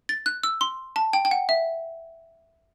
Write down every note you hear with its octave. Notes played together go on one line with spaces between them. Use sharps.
A6
F#6
E6
C6
A5
G5
G5
F#5
E5